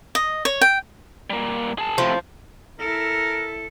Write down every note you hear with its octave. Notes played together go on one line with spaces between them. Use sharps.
D#5
C#5
G5
G3 A#3
G#4 A5
A2 C3 F3
E4 A4 A#4